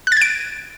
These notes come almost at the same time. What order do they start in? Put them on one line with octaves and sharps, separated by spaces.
F#6 A6 G#6 D7